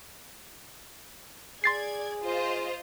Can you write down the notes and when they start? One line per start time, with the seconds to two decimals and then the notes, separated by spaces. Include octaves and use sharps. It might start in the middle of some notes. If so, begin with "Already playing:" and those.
1.64 G#4 D5 C6 G#6 A6 C7
2.22 F4 C5 D#5